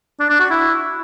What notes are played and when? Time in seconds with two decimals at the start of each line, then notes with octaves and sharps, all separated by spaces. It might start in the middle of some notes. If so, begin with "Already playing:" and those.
0.20 D4
0.30 D4
0.40 F#4
0.50 E4